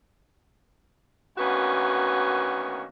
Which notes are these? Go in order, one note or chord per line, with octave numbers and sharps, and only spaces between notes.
D2 D#3 A#3 B3 C#4 F#4